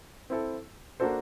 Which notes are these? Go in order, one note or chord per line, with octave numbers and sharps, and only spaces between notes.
C4 E4 A4
A#3 D4 F#4 A4 C5